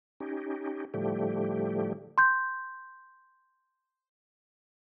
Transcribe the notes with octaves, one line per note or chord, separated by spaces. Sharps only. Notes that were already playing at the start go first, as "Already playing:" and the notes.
C#4 D#4 G4
A2 D3 F3 G3 A3 G4
C6 G6